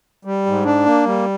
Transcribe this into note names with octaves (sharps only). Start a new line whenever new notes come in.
G3
G#2
D4
A#3
G3